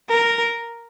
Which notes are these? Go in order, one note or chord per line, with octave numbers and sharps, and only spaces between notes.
A#4